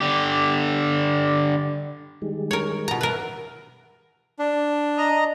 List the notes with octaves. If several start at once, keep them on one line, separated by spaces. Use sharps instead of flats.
D3 G4
D#3 G3 G#3
A#4 C#5
B2 F4 A#5
A#4 B4 E5
D4
D#5 A#5